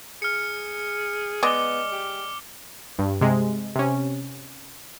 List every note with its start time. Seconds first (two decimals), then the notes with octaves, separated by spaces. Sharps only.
0.22 G#4 F6 C#7
1.43 G#3 B3 D5 D#5 D6 G7
1.92 G4
2.99 G2
3.21 C3 G#3
3.76 C3 C#4